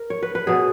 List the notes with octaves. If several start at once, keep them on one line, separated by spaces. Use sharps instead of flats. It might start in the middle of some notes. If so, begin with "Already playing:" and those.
Already playing: A#4
C#5
B4
B4
B2 F#3 G#4